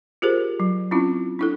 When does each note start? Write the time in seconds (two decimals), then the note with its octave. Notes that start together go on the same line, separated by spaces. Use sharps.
0.22 F4 G4 G#4 A#4 C5
0.60 F#3
0.91 C4 C#4 E4 F4
1.39 D4 E4 A4